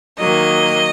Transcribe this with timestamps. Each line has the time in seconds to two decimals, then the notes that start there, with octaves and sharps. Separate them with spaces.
0.18 D#3 F#3 A#3 D#5